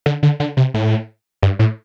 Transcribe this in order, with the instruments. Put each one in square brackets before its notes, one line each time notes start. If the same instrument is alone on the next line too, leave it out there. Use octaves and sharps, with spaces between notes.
[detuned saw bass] D3
D3
D3
C3
A2
G2
A2